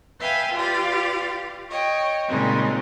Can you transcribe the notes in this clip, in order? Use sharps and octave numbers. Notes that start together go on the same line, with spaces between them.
B4 E5 F5 G5 G#5
F4 G4 B4 D5 F5
C#5 D#5 G5
A#2 C#3 G3 G#3 C4 D#4